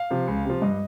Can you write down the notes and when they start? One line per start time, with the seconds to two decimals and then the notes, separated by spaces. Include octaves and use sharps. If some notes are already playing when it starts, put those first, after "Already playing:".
Already playing: F5
0.10 C3 F3
0.27 C#2
0.45 C3 F3
0.62 G2 D#5